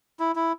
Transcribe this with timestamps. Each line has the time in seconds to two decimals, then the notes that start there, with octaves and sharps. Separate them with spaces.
0.20 E4
0.36 E4